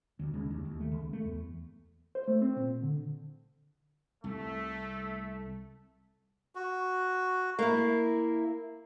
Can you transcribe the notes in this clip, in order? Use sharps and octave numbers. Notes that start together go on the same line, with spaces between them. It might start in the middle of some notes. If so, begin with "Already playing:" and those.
D2
C#2
D#2
D#2
A3
C#2
A3
E2
C5
A3
C4
A#2
D3
C2 A3
F#4
A#3 E4